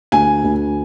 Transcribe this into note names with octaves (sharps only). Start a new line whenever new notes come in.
D2 G#5
D2